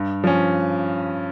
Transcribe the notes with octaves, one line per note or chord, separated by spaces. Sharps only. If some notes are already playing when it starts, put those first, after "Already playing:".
Already playing: G2
F3 C#4